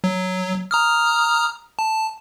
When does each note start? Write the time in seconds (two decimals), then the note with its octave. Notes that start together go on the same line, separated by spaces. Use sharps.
0.04 F#3
0.71 A#5 D#6 F6
1.79 A5